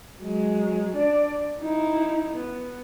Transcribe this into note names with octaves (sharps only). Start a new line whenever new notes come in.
F#3 G#3
D4 D5
D#4 E4
B3